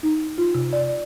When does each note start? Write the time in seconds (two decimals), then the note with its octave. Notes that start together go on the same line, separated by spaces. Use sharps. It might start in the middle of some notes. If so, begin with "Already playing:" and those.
0.03 D#4
0.38 F4
0.55 C3
0.73 D5